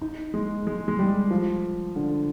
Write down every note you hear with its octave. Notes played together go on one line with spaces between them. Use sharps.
D#4
G#3
G#3
G#3
G3
F3
D3